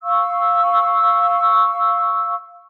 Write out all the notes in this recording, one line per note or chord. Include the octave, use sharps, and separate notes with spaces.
F5 C#6 E6